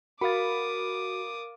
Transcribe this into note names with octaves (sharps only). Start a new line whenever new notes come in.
F#4 A#4 F5 B5 D6 D#6 A6